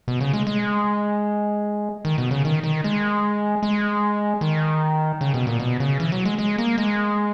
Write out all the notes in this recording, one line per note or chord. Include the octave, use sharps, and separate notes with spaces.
B2
C#3
G#3
G#3
D#3
B2
C#3
D#3
D#3
G#3
G#3
D#3
C#3
B2
A#2
B2
C#3
E3
F#3
G#3
G#3
A#3
G#3